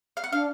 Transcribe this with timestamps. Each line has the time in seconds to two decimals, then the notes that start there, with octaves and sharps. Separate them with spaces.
0.17 F5
0.24 F#5
0.32 D4 F5